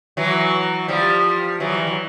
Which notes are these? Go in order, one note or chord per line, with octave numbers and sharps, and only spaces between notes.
E3 F#3
F3 G3
E3 F#3
G3
F#3